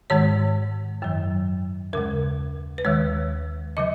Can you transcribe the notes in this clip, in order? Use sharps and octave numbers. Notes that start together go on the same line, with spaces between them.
G#2 D#3 G#3 C#5
F#2 D#3 F#3
D#2 C#3 G#3 A#4
B4
D#2 D#3 G#3 C#5
C#3 F#3 D#5